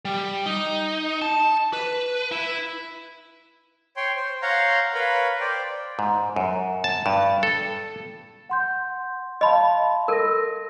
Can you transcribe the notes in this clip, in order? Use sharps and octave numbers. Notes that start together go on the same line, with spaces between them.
G3
D#4
A5
B4
E4
C#5 G5 C6
C5
C#5 F5 F#5 A#5 C6 G6
A#4 B4 C#5 F5 B5
C5 D5 G5
G#2
F#2
A5
G2
A4
F#5 C6 G6
D#5 F5 A5 B5 C6
A4 A#4 E6 A#6